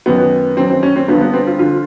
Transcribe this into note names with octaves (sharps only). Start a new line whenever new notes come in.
F#2 D#3 B3
F#2 D#3 C4
C4
C#4
C4
G2 D3 F3 B3
B3
C4
F4
D3 F3 F4